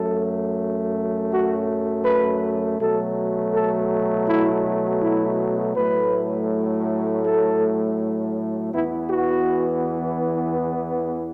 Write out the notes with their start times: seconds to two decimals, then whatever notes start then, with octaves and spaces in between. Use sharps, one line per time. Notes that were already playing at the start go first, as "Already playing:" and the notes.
Already playing: F#2 F#3 A3 A4
1.32 F#4
2.05 B4
2.79 B2 F#3 A3 A4
3.54 A4
4.28 E4
5.02 E4
5.76 A2 F#3 A3 B4
7.25 A4
8.73 E2 E3 B3 E4
9.10 F#4